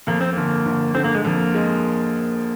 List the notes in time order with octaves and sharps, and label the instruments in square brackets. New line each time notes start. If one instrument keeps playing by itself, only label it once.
[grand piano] F2 [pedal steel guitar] A#3
[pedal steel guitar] C4
[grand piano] G1 [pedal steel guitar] A#3
[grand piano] G1
[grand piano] D3 [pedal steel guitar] C4
[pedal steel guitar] A#3
G#3
[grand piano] F2 [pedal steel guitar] A#3
[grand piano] G#3